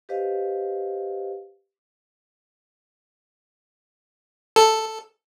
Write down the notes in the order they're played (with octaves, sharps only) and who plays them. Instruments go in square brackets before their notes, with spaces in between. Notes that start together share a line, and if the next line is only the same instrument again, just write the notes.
[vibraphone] G4 B4 C5 D#5 F5
[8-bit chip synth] A4